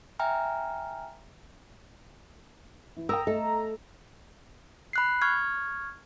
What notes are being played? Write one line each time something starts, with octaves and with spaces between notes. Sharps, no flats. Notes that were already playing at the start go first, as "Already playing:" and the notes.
E5 G5 G#5 A#5 F6
E3
A#4 G5 A#5 D#6 E6
A3 A4 D#5
B5 F#6 C7
C#6 F6 G#6